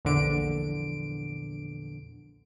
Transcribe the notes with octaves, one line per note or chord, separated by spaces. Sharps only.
A#1 E2 D3 D7